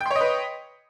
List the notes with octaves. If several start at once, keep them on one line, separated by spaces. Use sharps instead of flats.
B4 C#5 D#5 G5 C6